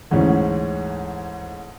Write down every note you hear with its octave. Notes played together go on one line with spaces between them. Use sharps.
D2 G#2 E3 C#4